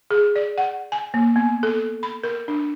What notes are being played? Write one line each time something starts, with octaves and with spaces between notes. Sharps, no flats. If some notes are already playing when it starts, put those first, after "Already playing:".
G#4
D5
F#5
G#5
A#3
B3
A4
B5
A#4
D4